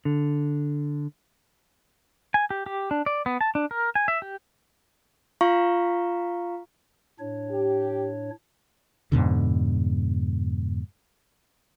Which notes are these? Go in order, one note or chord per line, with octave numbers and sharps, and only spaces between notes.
D3
G#5
G4
G4
D4
D5
B3
A5
D4
A#4
G#5
E5
G4
F4 F5 A#5 C#6
A2 D4 C#5
G4
F2 G#2 B2 D3